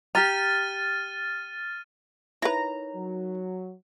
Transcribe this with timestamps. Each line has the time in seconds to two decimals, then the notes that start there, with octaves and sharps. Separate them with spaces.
0.15 G4 A#5 F6 A6 D#7
2.42 D#4 E4 A#4 B4 C#5 A#5
2.95 F#3